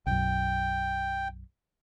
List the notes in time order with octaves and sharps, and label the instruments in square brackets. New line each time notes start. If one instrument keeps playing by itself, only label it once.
[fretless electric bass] B1 F#2 [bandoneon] G5